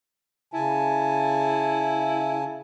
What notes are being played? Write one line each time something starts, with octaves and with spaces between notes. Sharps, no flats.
C#3 E4 G#5 A5